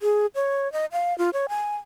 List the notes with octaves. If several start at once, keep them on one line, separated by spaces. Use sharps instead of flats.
G#4
C#5
D#5
F5
F4
C#5
G#5